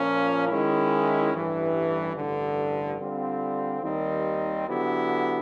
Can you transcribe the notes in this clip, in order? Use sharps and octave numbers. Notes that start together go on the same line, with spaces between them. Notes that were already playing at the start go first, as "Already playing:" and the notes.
Already playing: A#2 F3 A#3 C#4
D#3 G#3 C#4 E4
A1 G2 E3 G3
A1 G2 D3
D3 G3 C4 F4
D#2 D#3 G3 C4 D#4
D3 F#3 B3 E4 G4